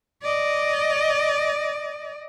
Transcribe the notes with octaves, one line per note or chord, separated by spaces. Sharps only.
D5 D#5